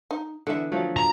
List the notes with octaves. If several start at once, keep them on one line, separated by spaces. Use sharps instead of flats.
D#4
D3 E3 B3 A4 E5
F3 F#3 A3
A#5